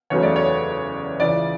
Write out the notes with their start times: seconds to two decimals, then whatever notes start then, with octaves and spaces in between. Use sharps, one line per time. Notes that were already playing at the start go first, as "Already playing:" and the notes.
0.10 F#1 E2 C#3 F#3 A3 C#5
0.23 D5
0.36 C#5
1.20 C#2 C#3 E3 D5